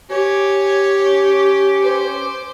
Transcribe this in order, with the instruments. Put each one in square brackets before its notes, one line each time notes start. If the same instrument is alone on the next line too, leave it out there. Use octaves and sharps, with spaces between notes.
[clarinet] G4 [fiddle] C#5 [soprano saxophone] G#5
[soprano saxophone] C#4
[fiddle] C5
[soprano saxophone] D6